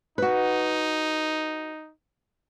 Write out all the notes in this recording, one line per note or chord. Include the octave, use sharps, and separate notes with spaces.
D#4 F#4 B4